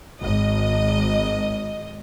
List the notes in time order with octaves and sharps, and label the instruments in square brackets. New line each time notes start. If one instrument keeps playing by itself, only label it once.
[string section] G#1 D#5